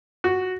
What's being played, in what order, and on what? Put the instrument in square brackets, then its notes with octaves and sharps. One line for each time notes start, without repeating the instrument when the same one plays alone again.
[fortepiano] F#4